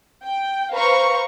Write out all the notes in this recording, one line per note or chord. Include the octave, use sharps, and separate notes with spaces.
G5
B4 C5 F5 A#5 C#6